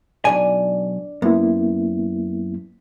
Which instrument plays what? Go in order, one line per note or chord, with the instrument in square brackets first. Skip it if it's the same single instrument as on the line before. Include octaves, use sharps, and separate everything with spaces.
[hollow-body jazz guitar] B1 G#2 G#5 [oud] D4
[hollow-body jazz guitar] F#2 [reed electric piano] A#3 B3 E4